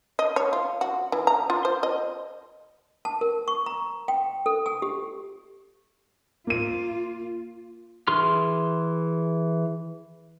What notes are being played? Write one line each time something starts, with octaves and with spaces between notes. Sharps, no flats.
D#5
C#5
F4
F#4
E3
A#5
F4
C5
D#5
A5
A#4
C#6
A#5
G5
A4
G#5
G4
A#3 F4 D#7
E3 G#4 C6 F6